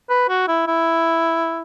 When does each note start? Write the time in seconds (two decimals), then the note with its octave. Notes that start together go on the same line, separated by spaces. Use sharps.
0.09 B4
0.29 F#4
0.48 E4
0.67 E4